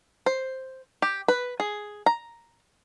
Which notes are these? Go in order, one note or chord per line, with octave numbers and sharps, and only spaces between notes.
C5
G4
B4
G#4
A#5